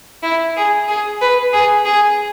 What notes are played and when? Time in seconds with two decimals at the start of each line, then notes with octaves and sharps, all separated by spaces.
0.23 E4
0.56 G#4
0.88 G#4
1.21 B4
1.53 G#4
1.85 G#4